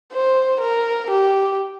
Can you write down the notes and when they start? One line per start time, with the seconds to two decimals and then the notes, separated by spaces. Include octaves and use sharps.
0.13 C5
0.61 A#4
1.11 G4